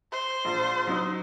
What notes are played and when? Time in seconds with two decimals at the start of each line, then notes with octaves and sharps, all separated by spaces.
0.13 C5
0.45 A#1
0.87 F#3 D#4